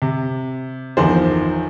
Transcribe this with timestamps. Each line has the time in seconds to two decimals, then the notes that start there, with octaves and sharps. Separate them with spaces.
0.02 C3
0.97 G1 E2 D#3 F3 C5